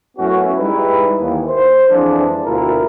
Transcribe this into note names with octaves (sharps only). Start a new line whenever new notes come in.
F#2 A3 B3 C#4 E4 F#4
G3 G#3 D#4 E4 B4
D#2 E3
C5
F2 E3 F3 G#3 D4
D2 B2 A#3 E4 F4 A#4